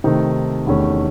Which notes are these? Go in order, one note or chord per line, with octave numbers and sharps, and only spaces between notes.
C3 D#3 A3 D#4
E2 C3 D#3 A3 C#4